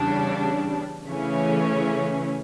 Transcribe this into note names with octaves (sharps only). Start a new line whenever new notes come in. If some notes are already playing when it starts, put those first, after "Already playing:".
Already playing: E2 C#3 G3 D4
C#3 E3 A3 C#4